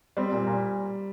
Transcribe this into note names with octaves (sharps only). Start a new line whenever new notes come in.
G3 C4
A#2
A#2